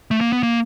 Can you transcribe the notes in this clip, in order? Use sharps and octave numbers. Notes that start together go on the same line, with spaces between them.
A3
A#3
B3
A#3